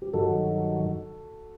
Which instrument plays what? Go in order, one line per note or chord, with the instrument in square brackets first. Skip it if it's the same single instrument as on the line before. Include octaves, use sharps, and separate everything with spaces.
[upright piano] G4
[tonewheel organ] G2 D#3 F#3 [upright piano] F#4 A4